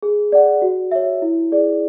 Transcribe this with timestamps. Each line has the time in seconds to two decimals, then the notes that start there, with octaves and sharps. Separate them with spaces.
0.03 G#4
0.32 D5 F#5
0.62 F#4
0.91 C#5 E5
1.22 E4
1.52 G#4 D5